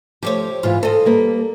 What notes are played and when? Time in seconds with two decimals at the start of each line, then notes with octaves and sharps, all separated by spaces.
0.23 F3 A3 G4 C5 C#5
0.63 G#2 E3 F4
0.83 A4 C5 D#5
1.05 G3 A#3 B4